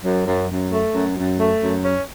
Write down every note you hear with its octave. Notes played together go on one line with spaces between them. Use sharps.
F#2
F#2
F#2
A3
F#2
F#2
A3
F#2
C#4